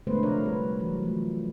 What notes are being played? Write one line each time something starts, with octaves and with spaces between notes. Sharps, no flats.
D3 G#3 A3 B3 B4 C5
C3 F3 A#4 C#5 D5
G3 B4
E3 F#3
F3 A3